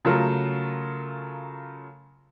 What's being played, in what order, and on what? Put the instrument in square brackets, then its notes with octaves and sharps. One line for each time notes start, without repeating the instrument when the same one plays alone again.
[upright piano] C#3 F#3 A3 F4 A4 A#4